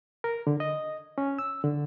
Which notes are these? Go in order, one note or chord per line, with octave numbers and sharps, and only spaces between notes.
A#4
D3
D#5
C#4
E6
D3